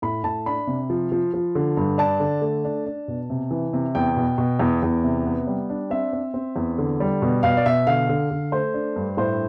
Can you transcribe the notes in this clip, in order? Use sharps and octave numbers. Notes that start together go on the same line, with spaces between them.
A2 B5
A2 A5
D4 B5
C3
F3
F3
F3
D3
G2
D4 A5
D3
A3
D4
D4
B2
C3
E3
C3
E2 G5
B2
B2
E2
E2
C3
B3
G3
D4
C4 E5
C4
C4
E2
D3
G3
B2
B2 F5
D5
B2 E5
D3 F5
D3
D3
A3 C5
D4
G2
A2 C5